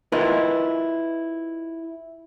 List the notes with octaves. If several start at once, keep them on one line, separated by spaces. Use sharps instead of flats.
E4 F4 A#4 B4 D#5